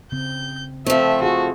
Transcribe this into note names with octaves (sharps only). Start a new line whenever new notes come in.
C#3 C4 G6
F3 A3 C4 A4 C5 E5
F4 F#4 G#4